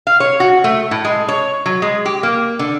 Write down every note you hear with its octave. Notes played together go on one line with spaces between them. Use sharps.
F5
C#5
F#4
A3
A2
G#3
C#5
F#3
G#3
G4
A#3
D3